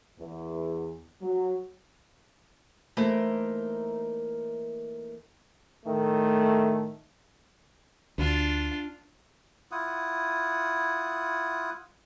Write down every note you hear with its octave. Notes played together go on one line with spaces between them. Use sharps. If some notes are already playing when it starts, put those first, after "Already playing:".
E2
F#3
E3 A3 A#3 D#4 A#4 C5
A2 D#3 A3
D2 D4 F4
E4 F4 F#5 D#6